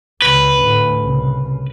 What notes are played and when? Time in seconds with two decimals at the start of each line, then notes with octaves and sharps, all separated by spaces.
0.22 C#2 C#3 B4
0.60 D2 A2
0.99 C2 C#3